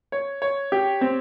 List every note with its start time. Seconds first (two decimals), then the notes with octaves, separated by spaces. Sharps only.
0.12 C#5
0.42 C#5
0.72 G4
1.01 C4